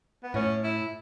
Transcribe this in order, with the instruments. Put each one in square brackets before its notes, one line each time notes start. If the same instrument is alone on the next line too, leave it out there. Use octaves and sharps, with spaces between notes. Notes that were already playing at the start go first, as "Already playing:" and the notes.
[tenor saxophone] B3
[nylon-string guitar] A2 [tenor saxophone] C#4
[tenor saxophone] E4